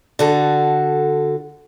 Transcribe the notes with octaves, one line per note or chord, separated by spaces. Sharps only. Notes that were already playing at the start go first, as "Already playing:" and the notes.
D3 F#4 A4